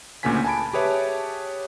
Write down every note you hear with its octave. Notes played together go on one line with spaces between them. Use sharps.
D2 A#2 C#3 A#3 G#5 B6
G#5 A5 B5 D7
G4 G#4 B4 C#5 E5 A5